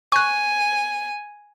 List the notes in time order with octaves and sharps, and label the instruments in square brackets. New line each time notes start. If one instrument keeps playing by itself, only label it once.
[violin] G#5 [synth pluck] C#6 F#6